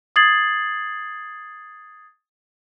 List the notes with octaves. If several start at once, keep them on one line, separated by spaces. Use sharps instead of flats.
D#6 G#6 A6 C7 F#7